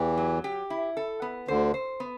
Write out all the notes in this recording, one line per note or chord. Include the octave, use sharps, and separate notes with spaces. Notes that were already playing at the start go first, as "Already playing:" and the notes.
Already playing: E2 E3 G4
F#3
G4
E4
A4
B3
D2 D3 C5
C5
B3